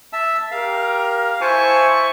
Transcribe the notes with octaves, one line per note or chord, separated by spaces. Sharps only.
E5 A5 E6
G4 A#4 F5
E4 C5 G#5 A5 C#6